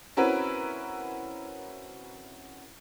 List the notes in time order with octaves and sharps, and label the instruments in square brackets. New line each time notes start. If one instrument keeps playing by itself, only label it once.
[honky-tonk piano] C4 C#4 E4 F#4 A#4 B4